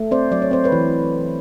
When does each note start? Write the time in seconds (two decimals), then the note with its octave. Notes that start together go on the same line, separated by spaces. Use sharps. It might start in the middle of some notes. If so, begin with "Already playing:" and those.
Already playing: A3
0.11 C4 C5 D5
0.32 F#3 D5
0.42 C#5
0.51 C4 C5
0.64 B4 C#5
0.72 E3